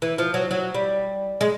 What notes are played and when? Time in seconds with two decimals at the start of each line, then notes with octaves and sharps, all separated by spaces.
0.02 E3
0.18 F3
0.34 F#3
0.51 F#3
0.74 G3
1.41 G#3